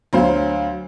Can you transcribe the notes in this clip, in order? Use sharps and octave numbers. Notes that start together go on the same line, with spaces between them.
D2 F#3 C5 F5